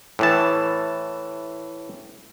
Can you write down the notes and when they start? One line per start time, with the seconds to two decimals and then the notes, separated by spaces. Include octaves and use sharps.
0.19 A2 E3 A5